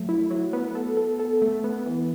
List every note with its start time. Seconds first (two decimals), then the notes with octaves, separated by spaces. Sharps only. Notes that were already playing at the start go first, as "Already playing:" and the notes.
Already playing: F#3 A3
0.09 E4
0.31 F#3
0.53 B3
0.75 A4
0.97 A4
1.19 A4
1.42 A3
1.64 B3
1.86 E3